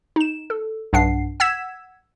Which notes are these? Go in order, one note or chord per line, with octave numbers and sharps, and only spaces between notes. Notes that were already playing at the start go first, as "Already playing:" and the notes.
D#4 E7
A4
B1 G2 D4 F#5 C7
F#5 E6 G#6 B6 E7